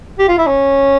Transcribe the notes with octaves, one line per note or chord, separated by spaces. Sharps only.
G4
F4
E4
C#4